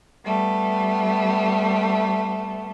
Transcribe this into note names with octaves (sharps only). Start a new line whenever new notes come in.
G3 A3 B3